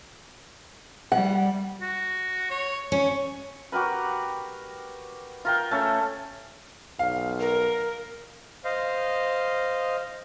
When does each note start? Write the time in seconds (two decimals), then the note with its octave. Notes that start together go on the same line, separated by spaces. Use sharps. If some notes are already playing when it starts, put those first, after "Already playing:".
1.12 G3 F#5
1.81 F#4
2.50 C#5
2.92 C#4 C#6
3.72 F#4 G4 A#4 B4
5.45 F4 A#4 G5
5.71 A3 C#4 A4
6.99 B1 F5
7.40 A#4
8.64 C5 D#5 F5